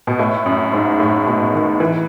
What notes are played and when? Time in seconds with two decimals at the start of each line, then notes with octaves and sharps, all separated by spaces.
0.07 B2
0.19 A2
0.46 F#2
0.73 G#2
1.00 A2
1.26 B2
1.54 D#3
1.80 E3